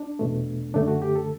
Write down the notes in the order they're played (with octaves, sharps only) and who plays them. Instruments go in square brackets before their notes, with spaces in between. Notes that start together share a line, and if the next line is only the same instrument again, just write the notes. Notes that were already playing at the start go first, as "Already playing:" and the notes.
Already playing: [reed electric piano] D4
E2 B2 A3
F#2 D3 A3 D4
F#4
G4
A4